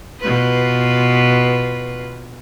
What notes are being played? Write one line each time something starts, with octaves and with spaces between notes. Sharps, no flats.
B2 F4 B4